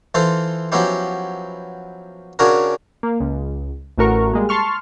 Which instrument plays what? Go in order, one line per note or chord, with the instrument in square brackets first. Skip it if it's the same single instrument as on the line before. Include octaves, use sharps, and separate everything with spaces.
[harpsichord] E3 F4 A4 C5
F3 F#3 B3 C#4 E4 G4
C#3 C#4 D4 F#4 G#4 A#4
[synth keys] A#3
C#2
A1 A3 F#4 A#4 C#6
G3 G#3 A#3
A5 C6 C#6 F6